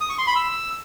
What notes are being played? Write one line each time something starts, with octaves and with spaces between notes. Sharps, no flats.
D#6
C#6
C6
B5
E6